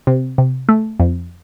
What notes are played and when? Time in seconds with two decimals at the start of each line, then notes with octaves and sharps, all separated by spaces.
0.07 C3
0.38 C3
0.69 A3
1.00 F2